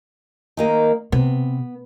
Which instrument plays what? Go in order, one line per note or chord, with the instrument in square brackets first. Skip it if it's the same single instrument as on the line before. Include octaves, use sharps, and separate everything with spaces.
[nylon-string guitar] D#3 A#3 D#5
[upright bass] C3 [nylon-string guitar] B3